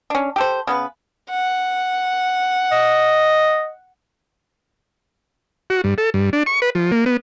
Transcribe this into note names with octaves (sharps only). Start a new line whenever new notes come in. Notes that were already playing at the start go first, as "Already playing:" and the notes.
C#4 D4
G4 A4 C5
C#3 B3 B4
F#5
D#5
F#4
G2
A4
G2
D4
C#6
B4
F3
A#3
B3